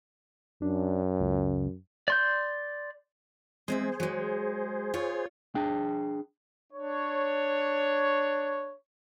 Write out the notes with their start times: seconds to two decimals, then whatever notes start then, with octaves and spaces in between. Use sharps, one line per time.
0.62 F#2 D4
1.20 C#2
2.08 D5 C6 G6
3.68 G#3 C4 G#4 C5 E5
4.00 F#3 G#3
4.94 F4 C#5
5.55 D4 G#4 G5
6.72 D4 C#5